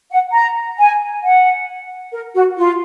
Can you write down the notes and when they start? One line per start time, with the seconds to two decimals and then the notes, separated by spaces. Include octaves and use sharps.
0.11 F#5
0.33 A#5
0.78 G#5
1.22 F#5
2.12 A#4
2.34 F#4
2.57 F4